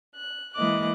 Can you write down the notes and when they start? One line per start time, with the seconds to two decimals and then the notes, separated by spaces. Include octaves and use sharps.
0.15 F#6
0.54 E3 G#3 A#3 D#5 D6 F#6